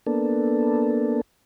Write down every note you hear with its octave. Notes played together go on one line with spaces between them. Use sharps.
A#3 B3 D4 A4